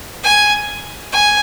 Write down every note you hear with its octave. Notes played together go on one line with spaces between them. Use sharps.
G#5
G#5